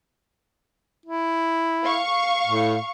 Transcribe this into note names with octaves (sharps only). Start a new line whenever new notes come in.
E4
F5 C#6
A2